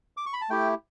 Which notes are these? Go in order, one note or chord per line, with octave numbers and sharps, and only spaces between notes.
D6
C#6
B5
A5
A3 E4 G4 G5